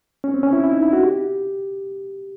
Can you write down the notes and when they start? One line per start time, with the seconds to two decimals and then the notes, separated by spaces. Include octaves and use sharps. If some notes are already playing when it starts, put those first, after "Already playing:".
0.24 C#4
0.34 C4
0.43 C#4
0.53 E4
0.64 E4
0.73 D#4
0.83 E4
0.93 F#4
1.03 G4